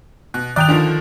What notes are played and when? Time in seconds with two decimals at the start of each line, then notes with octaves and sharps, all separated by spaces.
0.34 B2 F#6
0.56 D#3 D5 G5 F#6 F7
0.69 D3 D#3 F3 D4